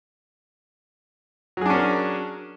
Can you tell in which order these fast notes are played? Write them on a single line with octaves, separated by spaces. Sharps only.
F#3 G#4 D4 C#4 A#4